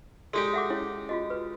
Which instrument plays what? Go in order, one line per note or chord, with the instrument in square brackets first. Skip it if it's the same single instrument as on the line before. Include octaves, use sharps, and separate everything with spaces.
[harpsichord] G#3 D#4 G4 [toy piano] F#4 A4 D5
[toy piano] E5 F#5 D6
C#4 E4 C#5
F4 F#4 D#5
B4